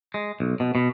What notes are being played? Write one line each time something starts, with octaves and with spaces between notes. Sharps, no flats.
G#3
B1
B2
B2